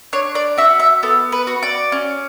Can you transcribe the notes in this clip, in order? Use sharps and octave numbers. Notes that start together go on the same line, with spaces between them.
D4 C#5
D5
F#4 E5
E5
B3 A4
B4
F#4
D5
C#4